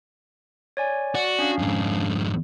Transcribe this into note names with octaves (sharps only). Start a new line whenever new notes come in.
C#5 D5 G#5
F#4 D5
C#4 D4 F5
F2 G#2